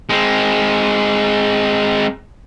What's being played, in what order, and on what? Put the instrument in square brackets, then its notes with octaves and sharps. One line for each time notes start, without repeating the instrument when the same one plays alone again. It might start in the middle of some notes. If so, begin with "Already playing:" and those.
[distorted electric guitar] G#3 C4